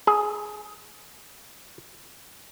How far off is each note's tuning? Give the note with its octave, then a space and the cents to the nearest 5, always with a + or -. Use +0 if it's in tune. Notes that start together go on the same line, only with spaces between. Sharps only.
G#4 +10